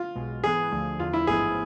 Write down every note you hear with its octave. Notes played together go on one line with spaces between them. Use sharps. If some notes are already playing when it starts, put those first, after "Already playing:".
Already playing: F4
B1 B2 G#3
G#2 E3 B3 G#4
D2 D3 F3 A3
E2 D3 F3 F4
E4
A1 G#2 F3 B3 G#4